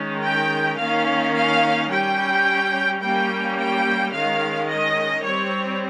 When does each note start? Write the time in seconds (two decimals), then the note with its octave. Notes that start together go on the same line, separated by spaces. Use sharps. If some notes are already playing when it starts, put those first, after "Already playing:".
Already playing: D#3 G#3 C#4
0.22 G5
0.78 D#3 A#3 C#4 F5
1.34 F5
1.89 G3 C#4 G5
3.01 G3 A#3 C#4 G5
3.57 G5
4.12 D#3 G#3 C#4 F5
4.68 D#5
5.23 G3 C4 C#5